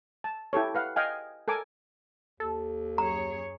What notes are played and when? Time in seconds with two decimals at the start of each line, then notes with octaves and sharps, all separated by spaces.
0.24 A5
0.53 E4 G4 A4 C#5
0.75 B4 F5 F#5
0.96 D#5 F5 G5 G#5
1.48 A4 A#4 G#5 D6
2.40 D#2 A4
2.98 F#2 G#4 C#5 A#5